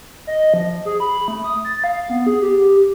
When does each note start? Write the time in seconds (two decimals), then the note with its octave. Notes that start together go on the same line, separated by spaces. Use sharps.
0.27 D#5
0.54 F3
0.85 G#4
1.00 B5
1.28 A3
1.44 D#6
1.65 A6
1.84 F5
2.09 B3
2.26 G#4
2.42 G4